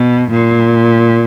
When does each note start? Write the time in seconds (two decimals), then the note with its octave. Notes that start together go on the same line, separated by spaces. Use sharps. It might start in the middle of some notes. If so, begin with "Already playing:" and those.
Already playing: B2
0.32 A#2